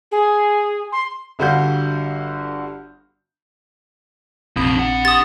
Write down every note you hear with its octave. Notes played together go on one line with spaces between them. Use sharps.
G#4
C6
G1 D3 G3 F#4 F5 G6
A#1 F2 C3 C4 F4 B5
D4 F#5
G4 D#6 A6